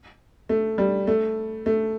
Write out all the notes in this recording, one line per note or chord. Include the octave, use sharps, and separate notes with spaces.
A3
G3
A3
A3